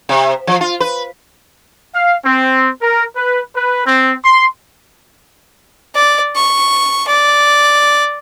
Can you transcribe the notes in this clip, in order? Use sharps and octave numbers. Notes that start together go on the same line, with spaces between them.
C3
F3
F4
B4
F5
C4
A#4
B4
B4
C4
C6
D5
C#6
D5